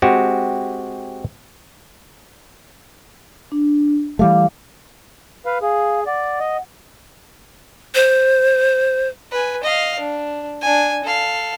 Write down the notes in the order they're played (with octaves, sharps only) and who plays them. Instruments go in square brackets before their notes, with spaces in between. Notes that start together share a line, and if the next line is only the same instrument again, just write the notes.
[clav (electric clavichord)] G#3 C4 F#4 G4
[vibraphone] D4
[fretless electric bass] E3 G3 A3 [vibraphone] F5 D6
[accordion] B4 F5
[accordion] G#4 [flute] F5
[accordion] D5 [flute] F#5
[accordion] D#5
[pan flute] C5
[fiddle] B4 G#5
D#5 F5
D4
D4 G#5
A4 F5